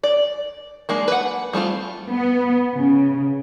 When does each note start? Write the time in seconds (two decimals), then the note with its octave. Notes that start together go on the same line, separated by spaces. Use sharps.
0.04 D5
0.89 G#3 A#3 D4
1.08 B4 F#5
1.53 G3 A3 C4 F4
2.09 B3
2.76 C#3